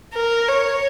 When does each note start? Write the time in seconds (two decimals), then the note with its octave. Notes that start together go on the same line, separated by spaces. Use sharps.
0.14 A#4
0.48 C#5